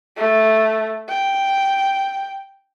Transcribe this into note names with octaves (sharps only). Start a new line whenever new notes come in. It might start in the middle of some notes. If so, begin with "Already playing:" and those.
A3
G5